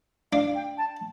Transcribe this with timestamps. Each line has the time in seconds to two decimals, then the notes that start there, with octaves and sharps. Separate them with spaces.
0.32 D4 F5
0.55 G5
0.77 A5